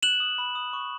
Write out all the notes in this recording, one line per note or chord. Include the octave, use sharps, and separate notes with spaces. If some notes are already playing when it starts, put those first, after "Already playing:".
F#6 E7 F#7
D#6
B5
D#6
C#6